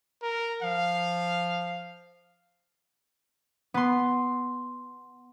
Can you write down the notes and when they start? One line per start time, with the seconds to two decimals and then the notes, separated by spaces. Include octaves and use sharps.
0.23 A#4
0.62 F3 F5
3.74 B3 C6